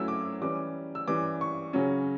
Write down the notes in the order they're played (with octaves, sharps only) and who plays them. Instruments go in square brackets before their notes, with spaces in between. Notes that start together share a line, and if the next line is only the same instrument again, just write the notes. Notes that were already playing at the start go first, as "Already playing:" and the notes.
Already playing: [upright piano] F#3 A3 C#4 E4 E6
D6
E3 G3 C#4 D6
E6
E3 G3 C#4 D6
C#6
C#3 F#3 C#4